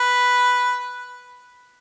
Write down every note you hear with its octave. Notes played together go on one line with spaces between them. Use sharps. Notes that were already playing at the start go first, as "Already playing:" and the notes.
Already playing: B4